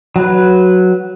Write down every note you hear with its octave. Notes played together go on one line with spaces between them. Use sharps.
F#3 B4